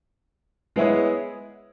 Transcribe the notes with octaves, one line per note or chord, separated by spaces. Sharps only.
G#3 B3 E4 G#4 C#5